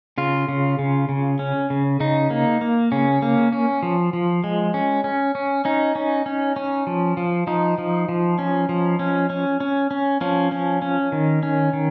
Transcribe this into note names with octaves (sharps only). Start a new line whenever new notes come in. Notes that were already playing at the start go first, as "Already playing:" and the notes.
C#3 F4
C#3
C#3
C#3
C#4
C#3
C#3 D#4
A#3
A#3
C#3 C#4
A#3
C#4
F3
F3
G#3
C#4
C#4
C#4
C#4 D#4
C#4
C#4
C#4
F3
F3
F3 D#4
F3
F3
C#4
F3
C#4
C#4
C#4
C#4
F3 C#4
C#4
C#4
D#3
C#4
D#3